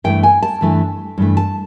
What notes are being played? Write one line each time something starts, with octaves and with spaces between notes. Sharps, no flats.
G2 E3 A3 G5
G#5
A5
G2 E3 A3
G2 E3 A3
A5